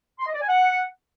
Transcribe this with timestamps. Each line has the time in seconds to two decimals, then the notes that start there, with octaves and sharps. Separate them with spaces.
0.19 C6
0.27 D#5
0.34 D5
0.41 G#5
0.48 F#5